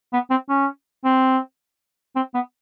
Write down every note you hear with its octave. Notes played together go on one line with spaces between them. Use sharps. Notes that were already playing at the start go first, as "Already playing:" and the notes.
B3
C4
C#4
C4
C4
B3